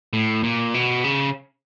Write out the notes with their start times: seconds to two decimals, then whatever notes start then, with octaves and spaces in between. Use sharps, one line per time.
0.13 A2
0.43 A#2
0.74 B2
1.04 C#3